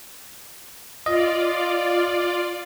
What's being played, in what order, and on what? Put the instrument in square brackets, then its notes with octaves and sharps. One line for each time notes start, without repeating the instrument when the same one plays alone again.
[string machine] F4 D5 [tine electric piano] D#5